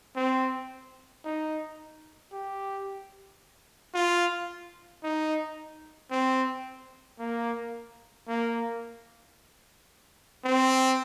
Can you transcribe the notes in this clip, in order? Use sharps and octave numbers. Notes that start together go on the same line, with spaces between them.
C4
D#4
G4
F4
D#4
C4
A#3
A#3
C4